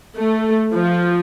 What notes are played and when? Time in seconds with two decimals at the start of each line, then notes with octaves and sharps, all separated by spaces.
0.16 A3
0.73 F3